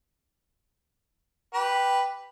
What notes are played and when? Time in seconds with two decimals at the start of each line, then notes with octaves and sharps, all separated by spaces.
1.54 G4 B4